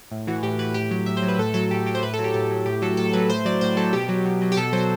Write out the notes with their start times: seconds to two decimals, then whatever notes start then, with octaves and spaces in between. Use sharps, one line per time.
0.12 A2
0.27 E3 F#4
0.43 A2 G4
0.59 E3 B4
0.74 A2 G4
0.91 F#3 G4
1.06 A2 E5
1.17 C5
1.22 F#3
1.28 B4
1.39 A2 A4
1.54 F#3 A4
1.71 A2 G4
1.86 F#3 G4
1.95 C5
2.03 A2 B4
2.14 A4
2.19 F#3
2.24 G4
2.34 A2 G4
2.51 F#3
2.66 A2 G4
2.82 F#3 A4
2.97 A2 A4
3.13 F#3 B4
3.29 A2 C5
3.45 F#3 D5
3.61 A2 C5
3.77 F#3 A4
3.93 B2 G4
4.09 F#3
4.25 B2
4.42 F#3
4.52 G4
4.57 B2 A4
4.73 F#3 C5